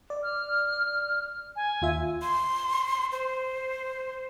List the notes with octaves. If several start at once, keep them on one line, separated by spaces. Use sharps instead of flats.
D5
F6
G#5
D#2 F4 E5
C6
C5